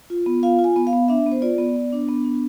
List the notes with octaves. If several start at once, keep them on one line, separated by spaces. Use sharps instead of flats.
F4
B3
F4 F5
F4
G#5
B3
F5
B3
D4 E5
B3
C5
F4 D5
B3
B3
D4
B3
D4